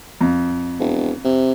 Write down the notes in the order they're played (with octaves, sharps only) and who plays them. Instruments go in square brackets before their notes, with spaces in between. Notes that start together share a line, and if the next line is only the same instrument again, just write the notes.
[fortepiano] F2
[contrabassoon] E1
C3